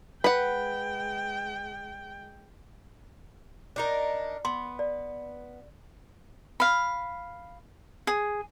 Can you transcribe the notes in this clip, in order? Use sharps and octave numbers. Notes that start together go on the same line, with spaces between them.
G#3 B4 F#5 G5 B5
D4 D#4 A#4
B3 C6
D5
F5 B5
G#4